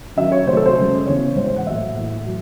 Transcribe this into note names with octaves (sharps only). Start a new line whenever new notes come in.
F#2 D#3 F#3 E5
C#5
C3 D#3 F#3 A3 C5
A4
C5
F#2 C#3 G#3
E2 C#3 E3 C#5
G#2 E3 G#3 C5
C5
F#5
A2 F#3 A3 E5
A2 E3 A3
F#3